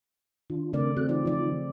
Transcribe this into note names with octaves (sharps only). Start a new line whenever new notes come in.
D#3 D4 F4
C#3 A3 C4 D4 A#4 D5
C4 F#4 A4 F#6
E3 D#4 F4 D5
F3 D5